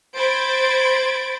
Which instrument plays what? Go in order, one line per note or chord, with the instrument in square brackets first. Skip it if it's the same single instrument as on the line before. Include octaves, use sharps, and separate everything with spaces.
[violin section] C5 B5 G#6 A6 D7